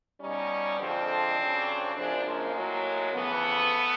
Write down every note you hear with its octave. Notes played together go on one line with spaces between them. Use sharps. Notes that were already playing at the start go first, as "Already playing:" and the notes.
B2 G3 C#4 D#4
F2 D3 F3 G#3 C4 D4
F2 C#3 F#3
F#2 C#3 F3 G#3 C4 D4
G#3 A#3
A2 F#3
F2 C#3 E3 A3 B3